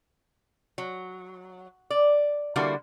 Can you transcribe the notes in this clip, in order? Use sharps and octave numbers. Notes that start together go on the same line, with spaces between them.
F#3
D5
D3 G3 A#3 E4 F#4